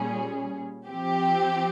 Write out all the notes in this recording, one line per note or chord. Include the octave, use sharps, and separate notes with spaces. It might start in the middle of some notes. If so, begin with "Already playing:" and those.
Already playing: A#2 G3 C#4 G#4
F3 C4 G4